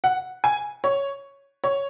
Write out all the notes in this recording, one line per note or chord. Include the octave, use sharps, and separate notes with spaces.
F#5
G#5
C#5
C#5